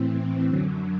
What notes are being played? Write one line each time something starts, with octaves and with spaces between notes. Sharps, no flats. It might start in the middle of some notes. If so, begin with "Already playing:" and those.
Already playing: A2 E3 C4
C4
F#2 D3 F#3